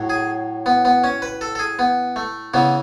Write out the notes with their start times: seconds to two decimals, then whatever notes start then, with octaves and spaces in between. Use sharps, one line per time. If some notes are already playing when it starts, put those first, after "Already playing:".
Already playing: A2 F#3
0.10 G#4
0.66 B3
0.85 B3
1.04 C#4
1.22 B4
1.41 A4
1.55 A4
1.59 G#4
1.79 B3
2.16 A3
2.54 C#3 E3 B3